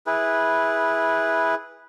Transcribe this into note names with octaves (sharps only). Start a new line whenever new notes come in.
E4 G#4 B4